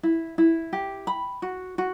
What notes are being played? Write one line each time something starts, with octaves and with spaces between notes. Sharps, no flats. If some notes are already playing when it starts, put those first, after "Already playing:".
E4
E4
G4
B5
F#4
F#4